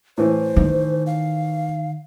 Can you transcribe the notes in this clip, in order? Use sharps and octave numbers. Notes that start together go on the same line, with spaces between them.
A2 E3 C5
D#3
F5